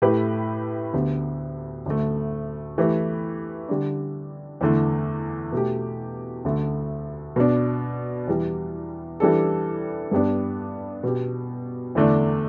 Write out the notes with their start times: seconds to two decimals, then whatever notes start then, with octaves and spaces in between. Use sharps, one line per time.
0.02 A2 A3 G4 B4
0.93 D2 D3 B3 G4
1.86 D2 D3 A3
2.78 E3 A3 G4 B4
3.69 D3 G3 D4
4.61 E2 D3 A3
5.52 B2 A3 G4
6.44 D2 D3 A3
7.36 B2 B3 D4
8.27 E2 E3 G3
9.20 E3 G3 D4 A4
10.11 G2 G3 B3 D4
11.03 B2 B3 G4
11.95 E2 D3 A3 D4